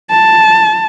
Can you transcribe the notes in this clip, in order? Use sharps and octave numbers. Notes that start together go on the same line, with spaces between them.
A5